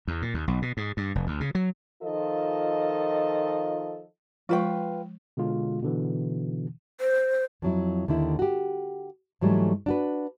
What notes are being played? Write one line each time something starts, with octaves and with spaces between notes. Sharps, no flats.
E2
A#2
D#2
B1
B2
G#2
G2
F1
D2
C#3
F#3
D#3 F3 F4 A4 D#5
F3 G#3 F4 B4 G5 C#6
B2 D3 G#3 F4
B2 D3 E3
C5
F2 F#3 E4
D#2 D3 D#3 E4
F#4 G4
G#2 E3 F#3 G3 A3
D4 F#4 B4